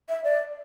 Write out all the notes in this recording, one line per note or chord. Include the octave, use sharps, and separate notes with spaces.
E5
D5